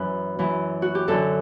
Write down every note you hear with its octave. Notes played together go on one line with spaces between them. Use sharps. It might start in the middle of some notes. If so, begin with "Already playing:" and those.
Already playing: F#2 E3 B4
F#2 E3
F#4
G4
F#2 D3 A4